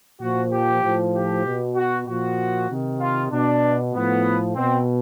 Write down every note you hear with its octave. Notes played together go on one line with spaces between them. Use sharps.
A#2 F3 F#4
G4
A2 F3
G4
B2
F#4
A#2 F3 F#4
C3 D#3
F4
B2 D4
A2 F3 B3
B2 C4